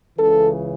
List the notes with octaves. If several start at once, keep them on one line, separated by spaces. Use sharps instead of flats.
C#2 C#3 E3 A4